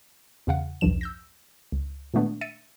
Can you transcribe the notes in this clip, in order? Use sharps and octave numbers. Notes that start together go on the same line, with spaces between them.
E2 C#3 F5 F#5
B1 E2 G2 F3 E7
E6 G6 A#6
C#2
A#2 D#3 G#3 A3 B3 D4
E5 E6 A6 C#7 D#7